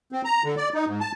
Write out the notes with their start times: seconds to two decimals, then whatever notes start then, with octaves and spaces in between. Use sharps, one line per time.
0.12 C4
0.25 A#5
0.44 D3
0.57 D5
0.74 D#4
0.86 G#2
1.00 A5